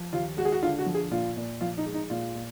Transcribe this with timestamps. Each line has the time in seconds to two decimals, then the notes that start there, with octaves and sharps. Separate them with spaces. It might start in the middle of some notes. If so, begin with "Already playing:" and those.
Already playing: F3
0.13 D#2 F4
0.37 G#3 F#4
0.45 G#4
0.52 F#4
0.63 D3 F4
0.79 F#4
0.86 F3
0.95 G#4
1.11 A#2 F4
1.37 A#2
1.61 F3 F4
1.78 D#4
1.86 G#3
1.94 D#4
2.10 A#2 F4
2.35 A#2